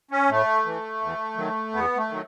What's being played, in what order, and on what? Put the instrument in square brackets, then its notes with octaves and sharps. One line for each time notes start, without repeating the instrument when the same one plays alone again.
[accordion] C#4
A2 A3
E3
E2
D#3 F#3
E2 B3
A3
D#3 F#3